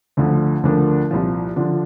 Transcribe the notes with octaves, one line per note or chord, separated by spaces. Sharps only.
D2 D3 F3
D2 D3 F3 D4 A#4
C2 A#2 F3
D3 F3 D4 F4